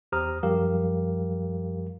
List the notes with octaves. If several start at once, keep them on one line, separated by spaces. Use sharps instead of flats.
E2 G4 C5 A#5 D#6 F6
F#2 F3 G3 G4 A#4 F5